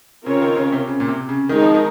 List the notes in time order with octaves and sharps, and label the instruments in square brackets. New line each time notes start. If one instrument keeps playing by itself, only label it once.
[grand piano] C#3 [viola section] C4 F4 A#4 C#5
[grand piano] C#3
D#3
C#3
C3
C#3
A#2
C3
C#3
[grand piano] D#3 [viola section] G#3 C4 D#4 G#4
[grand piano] F3
D#3